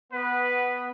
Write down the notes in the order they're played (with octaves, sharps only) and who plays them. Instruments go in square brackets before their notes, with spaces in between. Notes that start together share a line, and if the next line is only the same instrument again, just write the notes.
[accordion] B3 [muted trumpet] B4